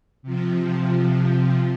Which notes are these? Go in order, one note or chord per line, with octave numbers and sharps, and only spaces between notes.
C3 F3